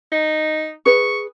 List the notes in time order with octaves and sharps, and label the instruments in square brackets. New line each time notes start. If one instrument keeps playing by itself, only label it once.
[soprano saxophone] D#4
[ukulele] G#4 B4 [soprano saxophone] C#6